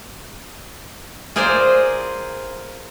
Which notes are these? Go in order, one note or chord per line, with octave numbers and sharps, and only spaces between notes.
F4 G#4 A#4 C5 D5